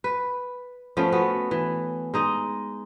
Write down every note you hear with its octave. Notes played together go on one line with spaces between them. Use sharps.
B4
F3 A3 B3 C#4
B3 F#4
E3
G#3 D#4 D#5